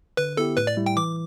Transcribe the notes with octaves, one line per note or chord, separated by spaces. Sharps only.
D3 B4
B3 E4 G4 A4
A2 B4
D5
G3 E4
G5
E3 D6